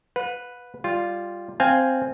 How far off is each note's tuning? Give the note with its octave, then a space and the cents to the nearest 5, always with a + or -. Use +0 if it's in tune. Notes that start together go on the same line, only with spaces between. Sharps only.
B4 +0 F#5 -45
G3 +0 F4 +0
C4 +0 F5 +0 G#5 +0